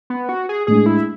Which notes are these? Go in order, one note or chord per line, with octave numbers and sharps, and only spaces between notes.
B3
F#4
G#4
A2 G#3 D4 G#4
E4